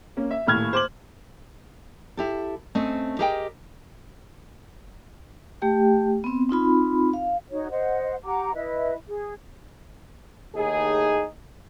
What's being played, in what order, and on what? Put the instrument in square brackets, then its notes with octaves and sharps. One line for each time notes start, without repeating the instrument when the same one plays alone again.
[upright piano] A#3 C#4
E5
D#1 A2 F6 G#6
C5 D6 F#7
[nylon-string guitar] E4 G4 A4
A3 C4 C#4 D#5
G4 G#4 A#4 D#5 E5 G5
[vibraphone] A3 G4 G5
B3 C4
C4 D#4 F4 B5
F5
[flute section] D#4 F#4 C#5
C5 D#5 F#5
G4 F#5 A#5 D6
E4 B4 D#5 E5
G#4
[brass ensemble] D#2 A2 D#4 G#4